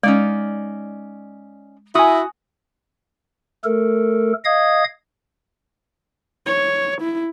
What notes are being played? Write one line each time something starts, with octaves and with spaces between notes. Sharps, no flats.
G#3 C#4 D#4 D5
E4 F#4 G#5 D#6
A3 A4 A#4
D#5 F5 D#6 G#6
C#5
E4